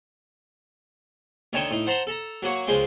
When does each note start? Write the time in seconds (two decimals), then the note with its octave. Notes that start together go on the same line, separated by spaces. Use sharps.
1.53 D2 D#3 D#4 C#5 G5 A5
1.71 A2 D#4
1.87 C5 F#5 A5 A#5 C6
2.07 A4 A#5
2.43 F#3 A#3 F#4 C#5
2.67 C#2 F3 G#3 G5 C6